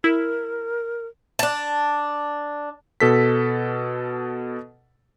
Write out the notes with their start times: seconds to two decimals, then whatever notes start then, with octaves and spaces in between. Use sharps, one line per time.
0.04 E4 A#4
1.39 D4 A5
3.00 B2 A4 B6